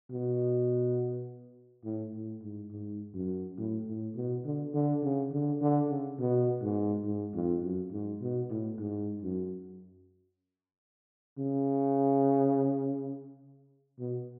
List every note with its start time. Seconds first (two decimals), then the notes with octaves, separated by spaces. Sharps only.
0.11 B2
1.84 A2
2.13 A2
2.42 G#2
2.72 G#2
3.14 F#2
3.58 A2
3.87 A2
4.15 B2
4.44 D3
4.74 D3
5.03 C#3
5.31 D3
5.61 D3
5.89 C#3
6.19 B2
6.62 G#2
7.05 G#2
7.34 F2
7.62 F#2
7.92 G#2
8.21 B2
8.49 A2
8.78 G#2
9.22 F#2
11.38 C#3
13.99 B2